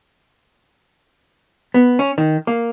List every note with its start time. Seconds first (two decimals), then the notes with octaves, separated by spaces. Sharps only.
1.74 B3
1.99 C#4
2.18 D#3
2.47 A#3